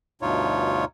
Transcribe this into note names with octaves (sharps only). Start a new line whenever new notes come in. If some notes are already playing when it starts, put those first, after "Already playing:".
D2 G2 B2 D#4 F4 C#5